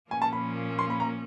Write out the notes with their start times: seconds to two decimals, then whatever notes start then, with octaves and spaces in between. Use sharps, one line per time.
0.11 A#2 F3 A#3 C#4 G#5
0.22 A5
0.33 B5
0.79 C6
0.90 B5
1.00 A#5